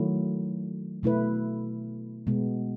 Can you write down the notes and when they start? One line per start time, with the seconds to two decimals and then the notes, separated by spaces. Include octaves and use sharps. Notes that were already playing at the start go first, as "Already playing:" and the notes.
Already playing: D#3 F#3 A3 E4
1.03 B2 A3 E4 B4
2.27 B2 G#3 B3